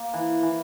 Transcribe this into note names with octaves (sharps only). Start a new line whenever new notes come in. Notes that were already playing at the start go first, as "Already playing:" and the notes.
Already playing: A#3
E3
E3